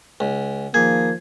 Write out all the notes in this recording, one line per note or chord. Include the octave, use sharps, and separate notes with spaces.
C#2
D#3 F3 A#3 G#4 G#6